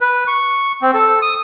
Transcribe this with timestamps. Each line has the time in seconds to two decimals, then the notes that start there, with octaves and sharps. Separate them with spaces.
0.01 B4
0.27 C#6
0.82 C4
0.94 A4
1.22 D#6